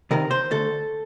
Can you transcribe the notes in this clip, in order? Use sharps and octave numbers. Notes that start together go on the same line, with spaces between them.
C3 D#3 A#4
C5
D2 A4